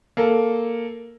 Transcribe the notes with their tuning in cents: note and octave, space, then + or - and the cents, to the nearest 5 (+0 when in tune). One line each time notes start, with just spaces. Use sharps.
A#3 +0 A4 +0